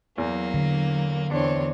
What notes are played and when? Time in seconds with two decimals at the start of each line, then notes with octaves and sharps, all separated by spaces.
0.18 E2 F#3 A#3
0.54 D3
1.31 E2 C4 D4 C#5